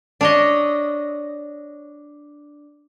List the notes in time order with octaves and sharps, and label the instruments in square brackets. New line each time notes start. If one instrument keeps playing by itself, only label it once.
[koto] D4 C#5 D#5